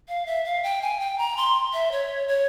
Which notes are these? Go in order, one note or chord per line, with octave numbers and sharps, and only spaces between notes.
F5
E5
F5
G5
G#5
G5
A#5
C6
E5
C#5
C#5